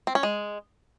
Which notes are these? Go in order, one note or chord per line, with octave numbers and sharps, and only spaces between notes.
C4
C#4
G#3